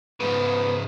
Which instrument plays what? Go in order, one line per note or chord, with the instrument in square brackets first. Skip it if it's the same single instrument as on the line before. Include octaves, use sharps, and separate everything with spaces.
[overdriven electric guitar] G#2 C#3 [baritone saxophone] B3